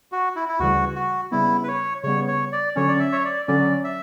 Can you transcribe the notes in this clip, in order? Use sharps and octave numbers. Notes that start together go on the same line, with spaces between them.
F#4
E4
E4
D2 C#3 E3 G3 F#4
F#4
C#3 G3 B3 E4
B4
C#5
C#3 G3 B3 C#5
C#5
D5
D3 F#3 C#4 C#5
D5
E5
C#5
D5
D3 F#3 C#4 D5
E5